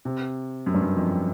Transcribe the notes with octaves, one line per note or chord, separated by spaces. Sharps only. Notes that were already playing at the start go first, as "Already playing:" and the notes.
C3
F#2
G2
F#2
F2